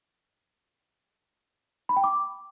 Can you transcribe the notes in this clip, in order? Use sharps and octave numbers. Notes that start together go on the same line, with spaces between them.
B5
G5
D6